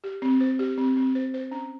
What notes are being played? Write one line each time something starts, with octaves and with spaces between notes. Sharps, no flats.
G4
C4
C5
G4
C4
C4
C5
C5
C#4